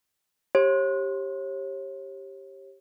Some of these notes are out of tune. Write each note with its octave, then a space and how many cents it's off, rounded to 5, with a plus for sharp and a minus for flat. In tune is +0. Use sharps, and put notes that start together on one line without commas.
G4 +0 C#5 -35